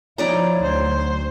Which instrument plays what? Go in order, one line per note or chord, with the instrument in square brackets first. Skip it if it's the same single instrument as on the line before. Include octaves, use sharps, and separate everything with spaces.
[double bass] F3 E4 [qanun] D#4 D5 A#5 [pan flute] C#5
[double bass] D2 F#3 [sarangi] C5